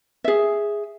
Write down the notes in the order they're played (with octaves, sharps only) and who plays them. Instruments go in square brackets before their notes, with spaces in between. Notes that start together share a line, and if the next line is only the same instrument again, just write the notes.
[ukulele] G#4 E5